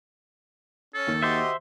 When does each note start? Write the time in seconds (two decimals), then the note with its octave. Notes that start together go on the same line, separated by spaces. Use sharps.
0.94 C#4 A4
1.07 D#2 D#3
1.23 F#4 G4 C5 D#5 E5